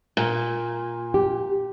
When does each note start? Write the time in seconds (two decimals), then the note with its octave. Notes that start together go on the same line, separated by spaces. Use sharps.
0.17 A#2
1.14 G4